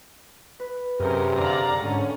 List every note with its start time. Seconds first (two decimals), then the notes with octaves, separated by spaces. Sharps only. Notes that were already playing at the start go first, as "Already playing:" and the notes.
0.60 B4
1.00 F#2 C3 C#4 G#4 A#4 G6
1.40 D3 D5 F5 A#5
1.81 G#2 D3 C#4